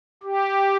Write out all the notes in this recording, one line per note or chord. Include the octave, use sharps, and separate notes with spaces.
G4